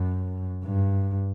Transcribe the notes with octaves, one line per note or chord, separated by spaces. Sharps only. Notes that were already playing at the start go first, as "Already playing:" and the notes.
Already playing: F#2
G2